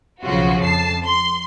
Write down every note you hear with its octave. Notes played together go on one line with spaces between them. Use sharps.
B1 C#3 F3 F4 F#4
F2 A5 C7
C6